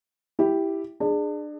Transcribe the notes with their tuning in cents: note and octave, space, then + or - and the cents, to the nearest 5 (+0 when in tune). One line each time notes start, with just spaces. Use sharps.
E4 +0 G4 +0
D4 +30 G#4 +0